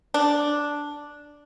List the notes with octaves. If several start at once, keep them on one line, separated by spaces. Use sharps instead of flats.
D4